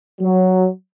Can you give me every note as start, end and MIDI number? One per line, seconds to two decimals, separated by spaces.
0.22 0.69 54